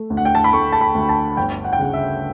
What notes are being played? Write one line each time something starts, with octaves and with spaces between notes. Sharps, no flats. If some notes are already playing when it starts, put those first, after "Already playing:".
Already playing: A3
D2
F#5
G5
A5
B5
A3 C#6
A5
B5
D2
A5
G1 G5
F#5
G5
C#3 F#5
E5